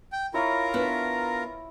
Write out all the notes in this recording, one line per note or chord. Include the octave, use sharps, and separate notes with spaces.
G5
E4 F4 A#4 C#5 E5 A#5
B3 D4